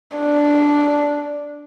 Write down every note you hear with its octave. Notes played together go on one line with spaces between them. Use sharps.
D4